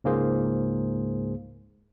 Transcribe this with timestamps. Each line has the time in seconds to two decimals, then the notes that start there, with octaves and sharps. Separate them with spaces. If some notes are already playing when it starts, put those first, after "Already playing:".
0.04 C#2 G#2 A#3 G#4 C5